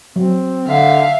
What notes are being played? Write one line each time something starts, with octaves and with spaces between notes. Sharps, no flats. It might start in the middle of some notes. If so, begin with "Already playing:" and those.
F#3 C4
D3 E5 F5